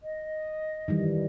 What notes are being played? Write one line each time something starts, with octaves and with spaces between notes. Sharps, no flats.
D#5
D#3 E3 G3